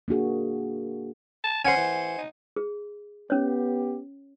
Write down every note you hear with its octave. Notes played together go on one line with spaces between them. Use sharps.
A#3 D4 F#4 G#4
A5
C#4 C5 F#5 G#5
E3
D#4
G#4
B3 C#4 G4 C#5